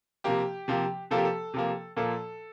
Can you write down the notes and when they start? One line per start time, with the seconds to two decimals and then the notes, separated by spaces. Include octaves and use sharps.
0.24 C3 F3 A#3 G4
0.68 C3 F3 A#3
1.11 C3 F3 A#3 A4
1.18 G4
1.25 A4
1.54 C3 F3 A#3
1.97 A#2 F3 A#3 A4